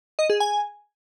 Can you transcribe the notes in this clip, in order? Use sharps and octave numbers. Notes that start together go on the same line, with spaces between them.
D#5
G#4
G#5